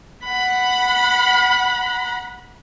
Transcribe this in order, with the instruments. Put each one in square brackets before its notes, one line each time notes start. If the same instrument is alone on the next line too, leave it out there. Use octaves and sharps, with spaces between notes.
[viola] F#5 B5